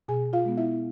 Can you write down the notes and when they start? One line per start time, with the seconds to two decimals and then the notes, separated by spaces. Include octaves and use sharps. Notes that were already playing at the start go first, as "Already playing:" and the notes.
0.08 B2 G#4 G#5
0.33 F4 F5
0.45 G#3 B3
0.57 E4 E5